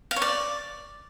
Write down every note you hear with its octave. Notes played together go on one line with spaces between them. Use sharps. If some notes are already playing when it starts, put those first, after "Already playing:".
F5
C#5
D5